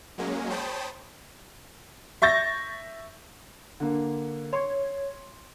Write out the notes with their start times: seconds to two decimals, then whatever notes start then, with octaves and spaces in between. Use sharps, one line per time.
0.18 F#3 G#3 A#3 C#4
0.50 C5 C#5 G5 A5 B5 D#6
2.22 E5 C#6 G6 A6 A#6
3.80 D3 A#3
4.53 C#5 C6 C#6